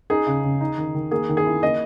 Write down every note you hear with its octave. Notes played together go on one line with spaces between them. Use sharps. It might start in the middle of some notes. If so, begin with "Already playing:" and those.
D#4 G#4
C#3
C#3
D#4
D#3
D#3
A#3 G#4
D#3
G#4
E4
A#3 D#5